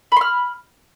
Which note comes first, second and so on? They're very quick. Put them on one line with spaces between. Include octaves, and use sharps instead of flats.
B5 C6 F6